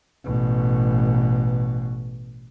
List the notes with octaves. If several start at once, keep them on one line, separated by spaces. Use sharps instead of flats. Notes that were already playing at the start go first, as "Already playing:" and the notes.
A1 B2